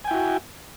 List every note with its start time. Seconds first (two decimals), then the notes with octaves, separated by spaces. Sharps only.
0.04 G#5
0.08 G5
0.11 E4
0.14 F#4